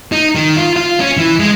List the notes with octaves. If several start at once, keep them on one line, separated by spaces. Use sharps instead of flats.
D#4
D#3
F4
F4
C#4
E3
G#3